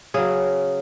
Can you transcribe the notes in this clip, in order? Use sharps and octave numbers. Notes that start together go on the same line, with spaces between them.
C#3 F#3 G#4